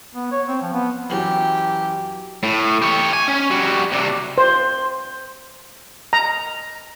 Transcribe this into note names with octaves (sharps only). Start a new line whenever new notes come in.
B3
C#5
C4
F3
B3
F#2 E3 F#3 G4
A2
G4 C#5
G#5
C#4
G3 F#4
C3 D4
C5
A#5